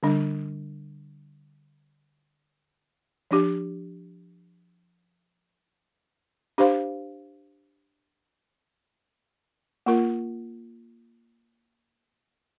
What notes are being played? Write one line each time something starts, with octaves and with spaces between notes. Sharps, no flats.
D3 G3 D4
F3 D4 G4
D4 G4 C5 F5
A#3 F4 A#4